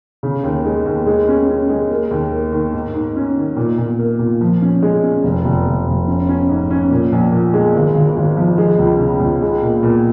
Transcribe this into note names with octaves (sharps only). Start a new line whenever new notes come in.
C#3
D#2
G#3
D#2
G#3
C#4
C#4
G#3
A#3
D#2
A#3
D#3
G#2
G#2
C#4
D#3
A#2
A#2
A#3
A#2
F3
C#4
G#3
C#4
F1
F1
F1
F1
C#4
C#4
G#2
C#4
A#2
A#1
A#2
G#3
G#1
G#1
G#1
F3
G#3
C#2
C#3
C#2
G#3
A#2
A#2